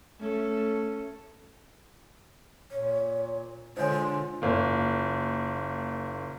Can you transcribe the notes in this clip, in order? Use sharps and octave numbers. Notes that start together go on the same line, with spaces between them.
A3 C#4 A4
A#2 C#5
D3 G#3 F4 C5 C#5 G#5
F#1 A#2